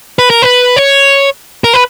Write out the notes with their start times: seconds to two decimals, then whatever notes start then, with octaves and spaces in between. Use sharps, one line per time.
0.19 B4
0.30 A#4
0.42 B4
0.76 C#5
1.64 A#4
1.74 B4